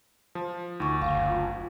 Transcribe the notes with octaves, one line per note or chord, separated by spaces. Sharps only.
F3
D2 D#4 C#6
F#1 F5
F4